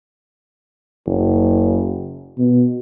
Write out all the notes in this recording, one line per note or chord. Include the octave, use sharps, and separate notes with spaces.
F#1
B2